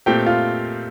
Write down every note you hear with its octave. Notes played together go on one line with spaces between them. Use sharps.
A#2 A3 C4 G4 G5
F4 F5